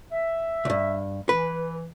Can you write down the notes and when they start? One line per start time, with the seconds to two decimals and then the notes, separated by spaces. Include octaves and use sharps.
0.12 E5
0.65 C2 G2
1.29 E3 B4